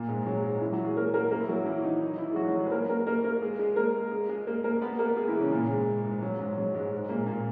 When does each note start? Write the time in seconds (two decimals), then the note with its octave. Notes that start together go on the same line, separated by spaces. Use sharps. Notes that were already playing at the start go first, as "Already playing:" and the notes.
Already playing: A#2 A#3
0.09 G#2 G#3
0.22 G#3
0.26 F#3
0.43 G#2 G#3
0.61 E3 E4
0.73 F#3 F#4
0.84 G#3 G#4
0.96 A#3 A#4
1.14 A#3 A#4
1.31 A#3 A#4
1.40 E4
1.49 F#3 F#4
1.66 E3 E4
1.83 D#3 D#4
2.01 D#3 D#4
2.18 E3 E4
2.31 G#4
2.36 F#3 F#4
2.48 F#3 F#4
2.59 G#3 G#4
2.66 B4
2.71 A#3 A#4
2.89 A#3 A#4
3.06 A#3 A#4
3.24 A#3 A#4
3.42 G#3 G#4
3.59 G#3 G#4
3.76 A#3 A#4
4.12 G#3 G#4
4.29 G#3 G#4
4.47 A#3 A#4
4.64 A#3 A#4
4.82 B3 B4
4.99 A#3 A#4
5.17 G#3 G#4
5.28 E3 E4
5.40 C#3 C#4
5.52 A#2 A#3
5.70 G#2 G#3
6.04 G#2 G#3
6.22 F#3
6.39 G#2 G#3
6.57 F#3
6.74 G#2 G#3
6.92 G#2 G#3
7.09 A#2 A#3
7.26 A#2 A#3